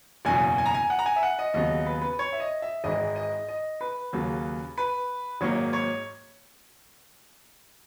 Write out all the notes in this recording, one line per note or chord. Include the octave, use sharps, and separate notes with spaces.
F#1 E2 B2 F#3 G#5
G#5
A#5
G#5
F#5
A#5
G#5
E5
F#5
D#5
D#2 C#3 F#3 B3 D#5
B4
B4
C#5
E5
D#5
E5
G#1 G#2 E3 G#3 D#5
D#5
D#5
B4
D#2 C#3 F#3 A#3
B4
G#1 G#2 F#3 A#3 C#5
C#5